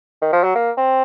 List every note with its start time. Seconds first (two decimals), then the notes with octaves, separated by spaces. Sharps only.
0.21 D#3
0.33 F3
0.44 F#3
0.55 A#3
0.77 C4